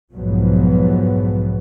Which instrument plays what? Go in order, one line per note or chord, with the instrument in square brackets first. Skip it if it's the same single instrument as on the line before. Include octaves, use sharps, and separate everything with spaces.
[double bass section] B1 F2 G#2 F3 F#3 B3